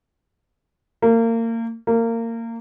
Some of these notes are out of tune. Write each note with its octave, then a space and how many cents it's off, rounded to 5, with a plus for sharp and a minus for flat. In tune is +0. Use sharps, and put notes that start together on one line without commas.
A#3 -30
A#3 -25